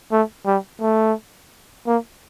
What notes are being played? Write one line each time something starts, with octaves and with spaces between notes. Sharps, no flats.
A3
G3
A3
A#3